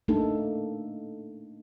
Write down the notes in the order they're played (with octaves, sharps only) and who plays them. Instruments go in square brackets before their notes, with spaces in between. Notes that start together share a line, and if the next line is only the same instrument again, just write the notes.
[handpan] A3 A#3 D4 D#4 A4